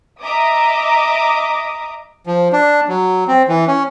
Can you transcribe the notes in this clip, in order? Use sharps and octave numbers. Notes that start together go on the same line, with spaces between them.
D#5 E5 A#5 D6 D#6
F3
D4
F#3
C4
E3
C#4